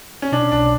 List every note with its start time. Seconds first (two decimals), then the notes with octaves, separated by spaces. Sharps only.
0.22 C#4
0.32 B2 D4
0.52 B1 D4